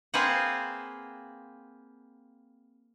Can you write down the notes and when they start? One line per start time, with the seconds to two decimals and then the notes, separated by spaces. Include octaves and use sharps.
0.14 A#3 C4 G#4 B4 C5 F#5